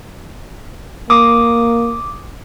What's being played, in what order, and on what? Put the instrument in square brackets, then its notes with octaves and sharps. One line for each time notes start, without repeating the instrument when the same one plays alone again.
[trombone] A#3 [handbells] D6 D#6